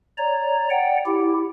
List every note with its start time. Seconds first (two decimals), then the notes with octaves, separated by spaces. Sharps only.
0.18 C#5 D5 A#5
0.70 D5 F#5 G5
1.06 E4 G4